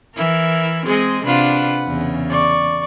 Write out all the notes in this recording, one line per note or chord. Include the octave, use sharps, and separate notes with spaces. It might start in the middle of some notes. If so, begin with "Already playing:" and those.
E3 E4 A#4
G#3 C4 G#4 D#5
C3 D4 F4 B4 F#5
E2 C#3
D5 C#6